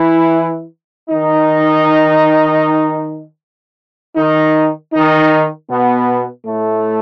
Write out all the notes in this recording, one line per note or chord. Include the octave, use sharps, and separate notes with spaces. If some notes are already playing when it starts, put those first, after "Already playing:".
Already playing: E3 E4
D#3 D#4
D#3 D#4
D#3 D#4
B2 B3
A2 A3